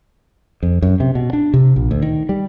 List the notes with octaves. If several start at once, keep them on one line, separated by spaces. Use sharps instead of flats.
F2
F#2
C3
B2
D4
C3
A#1
D2
D#3
G3